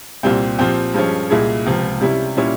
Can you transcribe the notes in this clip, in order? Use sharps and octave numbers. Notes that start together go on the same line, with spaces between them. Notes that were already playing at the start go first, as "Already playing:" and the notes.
C2 A#2 G3 C4
A#2 F3 C4 G4
G2 F3 G#3 C#4
C2 A#2 G#3 E4 G#4
C#2 C3 F3
C3 G3 C#4 E4
A#2 G3 C#4 E4